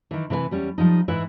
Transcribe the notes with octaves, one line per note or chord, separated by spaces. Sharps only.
D#3 E3
C3 E3 B4 D#5 G#5
E2 G3 C#4
F3 G3 D#4
G#2 E3 E4 B4 E5